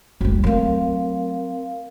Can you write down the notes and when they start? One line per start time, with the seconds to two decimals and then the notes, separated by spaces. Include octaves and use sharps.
0.21 F#1 D2 G3 F#4
0.44 F#3 A3 C4 A#4 F5